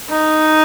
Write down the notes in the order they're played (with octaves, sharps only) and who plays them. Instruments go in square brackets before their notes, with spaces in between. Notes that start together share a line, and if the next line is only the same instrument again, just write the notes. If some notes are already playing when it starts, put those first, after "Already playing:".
[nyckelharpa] D#4